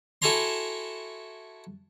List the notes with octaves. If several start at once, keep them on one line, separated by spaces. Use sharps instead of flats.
E4 F#4 A4 G#5 A#5 C6